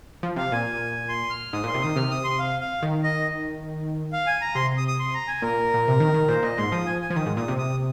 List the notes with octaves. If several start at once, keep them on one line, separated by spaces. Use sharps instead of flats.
F3
C3 F5
A#2 G#5
C6
F6
G#2 D#6
A#2
C6
C3
D#3 D#6
C3 F6
D#6
C6
F5
F5
D#3
D#5
F5
G#5
A#5
C3 C6
D#6
D#6
C6
A#5
G#5
A#2 A#4
A#2
C3
D#3
D#3
A#2 C5
A#2 D#5
G#2 C6
F3 D#6
G#5
G#5
F3
D#3 D#6
G#2
A#2 D#6
C3
D#6